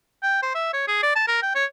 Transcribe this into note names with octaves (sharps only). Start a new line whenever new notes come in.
G5
C5
E5
C#5
G#4
D5
A5
A#4
G5
C#5